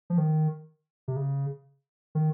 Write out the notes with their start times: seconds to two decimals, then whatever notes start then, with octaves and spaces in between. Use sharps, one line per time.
0.10 F3
0.18 D#3
1.08 C3
1.16 C#3
2.15 D#3